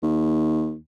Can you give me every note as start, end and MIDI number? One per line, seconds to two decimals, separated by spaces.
0.03 0.76 39